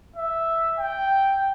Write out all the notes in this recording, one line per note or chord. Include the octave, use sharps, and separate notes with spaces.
E5
G5